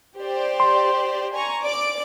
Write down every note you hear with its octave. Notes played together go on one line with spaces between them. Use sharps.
G4 C5 D5
C6
G#5 A#5 C#6
D5 D6 D7